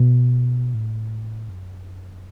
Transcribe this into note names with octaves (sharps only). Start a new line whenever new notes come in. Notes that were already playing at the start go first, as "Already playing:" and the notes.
Already playing: B2
A2
F#2